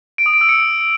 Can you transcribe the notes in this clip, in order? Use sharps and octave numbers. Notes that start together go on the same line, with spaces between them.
D7
D#6
D7
E6
C#7